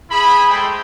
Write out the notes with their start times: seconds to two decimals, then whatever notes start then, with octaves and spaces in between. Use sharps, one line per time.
0.11 E4 G#4 B5
0.49 G#3 A3 C5 G5